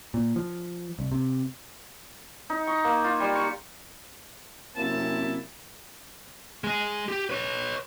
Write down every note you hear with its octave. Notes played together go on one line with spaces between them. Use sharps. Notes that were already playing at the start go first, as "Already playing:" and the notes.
A#2
F3
C2
C3
D#4
C#6
A#3
F4
G3
C#6
F#2 C3 A#3 C4 E4 A5
G#3 G#4
G4
B4 C#5